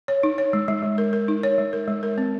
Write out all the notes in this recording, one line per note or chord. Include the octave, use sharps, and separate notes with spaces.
C#5
D#4
C#5
G#3
G#3
G#3
A#4
A#4
D#4
C#5
G#3
A#4
G#3
A#4
C4